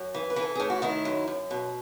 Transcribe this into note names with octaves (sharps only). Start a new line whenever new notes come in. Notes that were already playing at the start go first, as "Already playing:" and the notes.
Already playing: F#2
E3
B4
E3
A4
A2 G#4
F#4
D#3 E4
F#2
F#2
B2